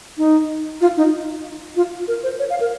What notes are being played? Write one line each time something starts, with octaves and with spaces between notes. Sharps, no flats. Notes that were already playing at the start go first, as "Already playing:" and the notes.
D#4
F4
D#4
F4
A#4
C5
C#5
F5
A#4